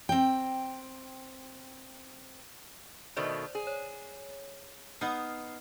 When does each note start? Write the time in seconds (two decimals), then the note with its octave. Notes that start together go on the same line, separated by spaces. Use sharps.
0.09 C4 G5
3.17 B2 D#3 A3 C5 D5
3.55 G#4
3.67 C#5
5.01 B3 D#4 F6 C7